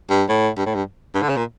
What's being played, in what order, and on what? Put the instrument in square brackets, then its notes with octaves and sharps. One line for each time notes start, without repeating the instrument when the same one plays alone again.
[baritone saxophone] G2
A2
G2
A2
G2
G2
D3
C#3
A#2